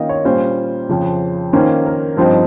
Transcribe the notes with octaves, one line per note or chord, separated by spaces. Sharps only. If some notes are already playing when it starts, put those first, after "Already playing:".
Already playing: D#3 A#3 C#4 F4 D#5 F5 G5
C#5
A#2 G3 C#4 F4 C5
F2 C#3 F3
D#3 A#3 C#4 F4 C5
A#4
G2 F3 C4 D#4 C5